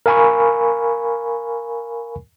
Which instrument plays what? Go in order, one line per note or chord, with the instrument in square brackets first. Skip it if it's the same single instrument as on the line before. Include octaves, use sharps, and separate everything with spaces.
[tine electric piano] A#4 F5 G#5 B5 C#6